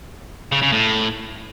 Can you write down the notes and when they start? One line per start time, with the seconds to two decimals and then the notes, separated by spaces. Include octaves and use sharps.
0.52 C#3
0.62 C#3
0.72 A2